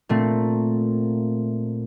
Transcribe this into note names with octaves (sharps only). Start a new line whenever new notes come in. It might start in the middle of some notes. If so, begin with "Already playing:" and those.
A#2 A3 C4